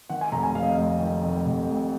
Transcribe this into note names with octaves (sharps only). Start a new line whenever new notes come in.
D#3 F#5
G#5
F1 A#5
G#5
F1 F5
D#5
F5
F2
D#3
F1
F1
F2